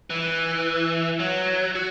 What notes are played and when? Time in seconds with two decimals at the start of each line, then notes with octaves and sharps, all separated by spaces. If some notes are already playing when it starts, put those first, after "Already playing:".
0.10 E3
1.20 F#3
1.75 F#4